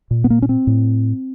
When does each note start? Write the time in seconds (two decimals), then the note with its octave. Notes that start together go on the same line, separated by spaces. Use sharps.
0.11 A#2
0.24 B3
0.30 A#3
0.42 C#4
0.49 C4
0.67 A2